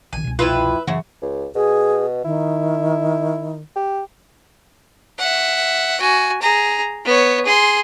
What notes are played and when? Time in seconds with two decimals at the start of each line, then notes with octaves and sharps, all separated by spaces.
0.13 A#1 D#3 G#5
0.24 C2 B2
0.39 F2 E4 F4 B4 E5
0.87 F#2 C#3 E3 F#4
1.22 C#2
1.55 B2 G#4
2.24 D#3 E4
3.76 G4
5.18 E5 F#5
6.00 F#4 G#5
6.41 G#4 A#5
7.05 B3 C#5
7.45 G#4 C6